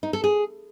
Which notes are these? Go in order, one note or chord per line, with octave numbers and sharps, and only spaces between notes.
D#4
A4
G#4